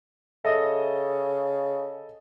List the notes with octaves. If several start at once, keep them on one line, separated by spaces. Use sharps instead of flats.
C#3 A4 D#5 E5 D#6